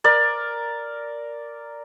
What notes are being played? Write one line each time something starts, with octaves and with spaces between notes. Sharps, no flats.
A#4 D5